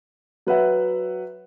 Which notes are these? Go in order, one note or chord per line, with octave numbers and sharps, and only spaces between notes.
F#3 B4 E5 F#5